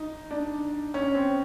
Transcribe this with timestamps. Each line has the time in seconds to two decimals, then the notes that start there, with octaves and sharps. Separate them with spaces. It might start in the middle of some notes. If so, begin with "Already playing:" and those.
Already playing: D#4
0.31 D4
0.94 C#4
1.15 C4